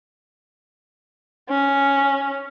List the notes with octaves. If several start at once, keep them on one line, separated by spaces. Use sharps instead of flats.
C#4